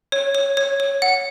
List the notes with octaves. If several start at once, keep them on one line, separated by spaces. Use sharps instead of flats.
C#5
C#5
C#5
C#5
F#5